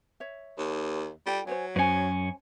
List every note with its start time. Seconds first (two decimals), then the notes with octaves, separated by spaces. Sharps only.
0.20 C#5 E5
0.58 D#2
1.26 G3 F4 A4 G5
1.47 F#3 C5 C#5 G#5
1.76 F#2 C#4 C5 G#5